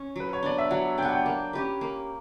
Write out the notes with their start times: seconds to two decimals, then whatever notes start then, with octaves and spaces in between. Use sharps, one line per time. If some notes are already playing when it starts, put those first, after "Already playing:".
Already playing: C#4
0.16 F#3 B4
0.33 C#5
0.43 B3 D4 D5
0.58 E5
0.71 F#3 F#5
0.98 D4 G5
1.03 B3 F#5
1.12 G5
1.26 A#3
1.53 C#4 G4 B4
1.81 A#3